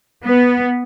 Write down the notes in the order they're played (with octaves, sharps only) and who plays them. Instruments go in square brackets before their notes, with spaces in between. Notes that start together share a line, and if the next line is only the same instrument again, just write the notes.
[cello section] B3